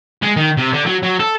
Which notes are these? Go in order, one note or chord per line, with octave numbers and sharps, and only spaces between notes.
G#3
D#3
C3
D3
F#3
F#3
A4